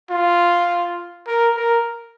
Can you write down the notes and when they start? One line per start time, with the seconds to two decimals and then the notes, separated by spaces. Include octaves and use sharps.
0.10 F4
1.27 A#4
1.56 A#4